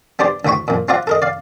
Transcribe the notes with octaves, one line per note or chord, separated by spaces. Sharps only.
B3 D4 G4 C5 D5
D2 A2 G5 B5 C#6
F2 A#2
C4 F4 D5 E5 F#5 A#5
A4 A#4 D#5
D5 F5